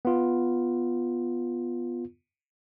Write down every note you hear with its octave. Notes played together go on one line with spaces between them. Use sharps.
B3 F4